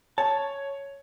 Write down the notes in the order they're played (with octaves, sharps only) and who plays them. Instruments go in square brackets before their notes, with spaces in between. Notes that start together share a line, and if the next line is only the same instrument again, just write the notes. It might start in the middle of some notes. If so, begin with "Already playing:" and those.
[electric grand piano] C#5 [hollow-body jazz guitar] A5